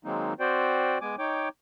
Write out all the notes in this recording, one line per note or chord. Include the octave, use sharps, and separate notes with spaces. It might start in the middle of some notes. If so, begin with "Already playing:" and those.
D#3 F#3 G#3 A#3 C4 D#4
C4 F#4 C5 D5 G5
G#3 B3 G#5 D6
D#4 C#5 G5 D6